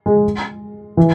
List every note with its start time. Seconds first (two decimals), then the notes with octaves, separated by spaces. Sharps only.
0.06 G#3
0.97 E3